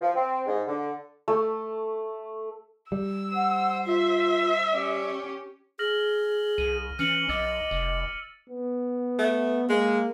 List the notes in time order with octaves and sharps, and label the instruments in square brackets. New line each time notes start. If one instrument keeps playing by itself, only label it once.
[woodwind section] F3
C4
G#2
D3
[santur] A3
[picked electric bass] G3 [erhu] E6
[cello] C5 [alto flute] F#5
[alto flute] F4 [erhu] E5
[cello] C#4 G4 [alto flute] D5
[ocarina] G#4 [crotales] F6 A#6 F#7
[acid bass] C2 [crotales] D#7
[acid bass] E3 [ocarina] C#4 [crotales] F6 C#7 F#7
[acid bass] B1 [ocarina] D#5 [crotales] D6 E6 A6
[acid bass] F1
[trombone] B3
[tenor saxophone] A3
[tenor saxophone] G#3 [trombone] A#3